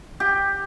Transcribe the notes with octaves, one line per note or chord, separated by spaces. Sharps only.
G4